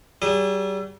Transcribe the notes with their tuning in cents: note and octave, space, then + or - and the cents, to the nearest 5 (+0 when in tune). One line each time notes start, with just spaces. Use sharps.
G3 -40 G#4 -35